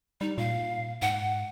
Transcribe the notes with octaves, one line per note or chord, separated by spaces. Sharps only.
G3 D#4
A#2 F5
G#2 F#5